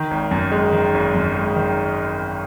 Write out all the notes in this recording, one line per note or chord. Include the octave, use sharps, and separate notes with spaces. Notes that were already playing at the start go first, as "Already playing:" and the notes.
Already playing: D#3
G#1
F#2
G#3
D#3
G#1
F#2
G#3
D#3